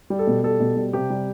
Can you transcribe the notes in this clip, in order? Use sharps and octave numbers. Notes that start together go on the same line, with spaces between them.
G3
A4
B2
G3 A4
B2
G3
C3 G4
G3